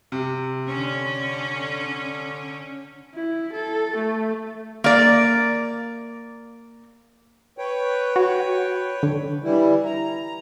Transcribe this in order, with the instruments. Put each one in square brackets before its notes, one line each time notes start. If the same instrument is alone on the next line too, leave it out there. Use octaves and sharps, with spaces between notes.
[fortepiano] C3
[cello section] D3 C#4
[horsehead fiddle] E4
A4
A3
[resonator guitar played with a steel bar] A#3 D5
[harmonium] B4 C#5 G5
[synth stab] F#4
D3
[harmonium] E3 G3 E4
A#5